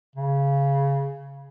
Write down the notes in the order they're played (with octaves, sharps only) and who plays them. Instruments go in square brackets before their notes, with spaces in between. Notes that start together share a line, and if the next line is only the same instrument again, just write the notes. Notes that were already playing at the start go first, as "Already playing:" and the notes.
[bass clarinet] C#3